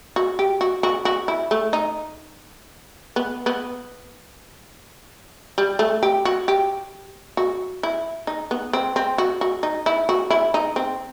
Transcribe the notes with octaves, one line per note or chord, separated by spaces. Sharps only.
F#4
G4
F#4
F#4
F#4
E4
A3
D#4
B3
B3
G3
A3
G4
F#4
G4
F#4
E4
D#4
B3
C4
C4
F#4
F#4
D#4
E4
F#4
E4
D#4
C4